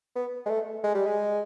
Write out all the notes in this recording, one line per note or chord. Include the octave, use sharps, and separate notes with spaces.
B3
G#3
A3
G#3
G3
G#3